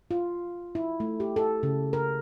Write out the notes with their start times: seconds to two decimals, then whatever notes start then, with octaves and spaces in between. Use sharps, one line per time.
0.11 F4
0.75 E4
1.00 A3
1.20 G4
1.36 A4
1.63 C#3
1.93 A#4